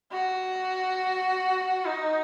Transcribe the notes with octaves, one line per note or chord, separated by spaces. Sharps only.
F#4
D#4